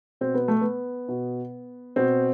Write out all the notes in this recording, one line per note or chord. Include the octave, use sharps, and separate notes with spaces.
B2 C4
B3
A3
B3
B2
B2 C4